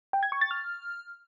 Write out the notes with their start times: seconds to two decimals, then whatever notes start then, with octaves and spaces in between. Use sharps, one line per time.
0.13 G5
0.23 G#6
0.32 C#6
0.41 A6
0.51 F6